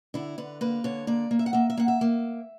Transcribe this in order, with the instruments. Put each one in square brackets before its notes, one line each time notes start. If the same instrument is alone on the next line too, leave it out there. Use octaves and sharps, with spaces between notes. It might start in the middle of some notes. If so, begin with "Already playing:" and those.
[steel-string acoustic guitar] D3 E4
D3 B4
A#3 B4
D3 C#5
A#3 D5
A#3
E5
F#5
A#3 E5
E5
A#3 F#5
E5
A#3